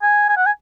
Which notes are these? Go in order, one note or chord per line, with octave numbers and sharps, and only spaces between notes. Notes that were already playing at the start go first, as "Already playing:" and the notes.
G#5
G#5
F#5
G#5